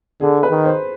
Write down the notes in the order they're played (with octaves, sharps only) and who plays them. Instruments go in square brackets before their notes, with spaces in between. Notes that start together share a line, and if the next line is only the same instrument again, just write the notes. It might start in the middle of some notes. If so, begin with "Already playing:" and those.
[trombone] D3 [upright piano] G#4
[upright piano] B4
[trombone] D#3
[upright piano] C5